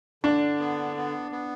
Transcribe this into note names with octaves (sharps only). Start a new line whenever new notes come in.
D3 D4
B3
B3
B3